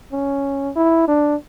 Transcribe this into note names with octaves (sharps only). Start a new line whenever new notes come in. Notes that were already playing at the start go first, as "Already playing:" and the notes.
C#4
E4
D4